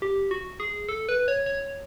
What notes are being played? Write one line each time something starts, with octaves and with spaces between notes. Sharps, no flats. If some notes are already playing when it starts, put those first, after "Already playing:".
G4
F#4
G#4
A4
B4
C#5
C#5